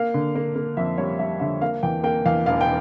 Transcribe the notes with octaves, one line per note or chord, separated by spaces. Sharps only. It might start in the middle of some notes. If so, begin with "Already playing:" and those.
Already playing: A#3 F5
D3
A#3
A#3
F2 E5
G3 C#5
G3 E5
D3 E5
A#3 F5
E2 G5
A#3 G5
E2 F5
E1 F5
G5